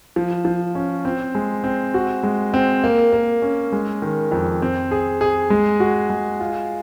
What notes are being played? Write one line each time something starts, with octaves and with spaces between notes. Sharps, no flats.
F3
F3
C#4
C4
G#3
C4
F#4
G#3
C4
A#3
A#3
C#4
G#3
D#3
F2
C4
G#4
G#4
G#3
F#4
G#3
F4